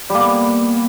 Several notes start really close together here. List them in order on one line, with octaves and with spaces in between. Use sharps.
G3 A#3 B3